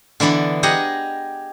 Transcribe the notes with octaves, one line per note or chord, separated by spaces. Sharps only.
D3 E3 B3 D5 B5
G4 G#4 D#5 F#5 A#5